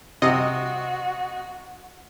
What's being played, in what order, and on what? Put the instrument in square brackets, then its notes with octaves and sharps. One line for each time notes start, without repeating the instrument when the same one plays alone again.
[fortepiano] C3 [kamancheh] F#4 [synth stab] D#5